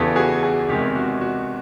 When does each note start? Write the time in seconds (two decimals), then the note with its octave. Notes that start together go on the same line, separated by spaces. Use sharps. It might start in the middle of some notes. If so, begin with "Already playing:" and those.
Already playing: E2 C#3 E3 G4 A4
0.16 F#4 G#4
0.43 F#4 G#4
0.68 E2 C3 D#3 G#3 G4
0.95 F#4
1.21 F#4